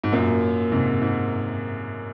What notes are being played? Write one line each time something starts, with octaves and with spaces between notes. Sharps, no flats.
G#2
F#2 A#2
G#2 C3
G#2